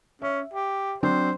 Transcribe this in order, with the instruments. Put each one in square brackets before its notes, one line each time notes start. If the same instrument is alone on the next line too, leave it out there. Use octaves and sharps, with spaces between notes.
[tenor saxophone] C#4 [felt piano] E5
[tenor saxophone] G4
[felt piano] F#3 C4 D4 [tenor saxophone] C5